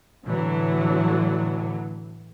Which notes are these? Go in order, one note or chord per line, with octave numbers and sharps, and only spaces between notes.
A2 D3 E3 F#3